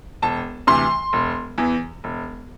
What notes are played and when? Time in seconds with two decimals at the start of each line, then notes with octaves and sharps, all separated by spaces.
0.22 E1 A5
0.67 D2 C3 E3 C6
1.13 E1
1.58 E2 E3
2.04 E1